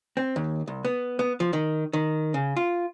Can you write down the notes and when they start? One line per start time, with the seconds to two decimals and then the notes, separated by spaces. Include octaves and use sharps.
0.17 C4
0.36 D#2
0.67 C2
0.85 B3
1.19 B3
1.40 F3
1.53 D#3
1.93 D#3
2.34 C#3
2.57 F4